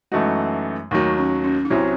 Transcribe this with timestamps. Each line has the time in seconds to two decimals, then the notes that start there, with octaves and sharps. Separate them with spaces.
0.12 F#2 E3 G#3 A3 D#4 F#4
0.91 D#2 D#3 F#3 A3
1.18 C#4
1.44 C#4
1.65 D#4
1.70 C2 C3 F#3 C#4 E4